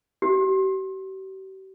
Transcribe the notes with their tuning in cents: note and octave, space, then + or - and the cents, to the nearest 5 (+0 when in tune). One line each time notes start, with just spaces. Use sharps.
G4 -45